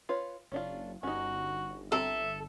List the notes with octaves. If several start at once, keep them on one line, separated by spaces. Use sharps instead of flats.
F4 B4 C#5
F#1 C#4 D4 F4
G1 C#4 D#4 F#4
C4 A4 E5 A#5